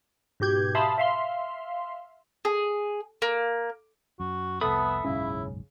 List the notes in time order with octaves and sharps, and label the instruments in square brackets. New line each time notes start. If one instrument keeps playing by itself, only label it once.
[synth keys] G#2 B2 G4 G6 G#6
E5 F5 A5 B5 C6 D#6
E5 F5 C6
[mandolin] G#4
A#3
[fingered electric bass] F#2 [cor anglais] F#4
[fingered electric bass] F1 C2 [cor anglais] B3 [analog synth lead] A4 [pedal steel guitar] E5 B5 D#6
[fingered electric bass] F#1 B1 G#2 [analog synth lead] C#3 [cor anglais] E4